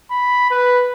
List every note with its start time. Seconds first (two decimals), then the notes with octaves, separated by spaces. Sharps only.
0.11 B5
0.51 B4